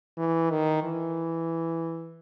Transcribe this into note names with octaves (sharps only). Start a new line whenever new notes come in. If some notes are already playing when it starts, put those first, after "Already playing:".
E3
D#3
E3